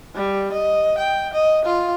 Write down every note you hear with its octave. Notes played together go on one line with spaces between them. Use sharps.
G3
D#5
G5
D#5
F4